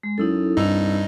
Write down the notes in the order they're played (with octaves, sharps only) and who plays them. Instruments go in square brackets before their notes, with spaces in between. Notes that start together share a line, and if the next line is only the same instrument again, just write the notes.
[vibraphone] G#3
[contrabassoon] F#2 [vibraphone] D#4 E4 A4
[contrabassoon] C2 [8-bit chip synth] G2 D#4 [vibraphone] D4 E6